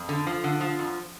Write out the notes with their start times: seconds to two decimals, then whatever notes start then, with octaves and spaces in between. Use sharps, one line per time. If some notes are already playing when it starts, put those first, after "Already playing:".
Already playing: F2
0.09 D3
0.27 F3
0.44 D3
0.61 F3
0.79 F2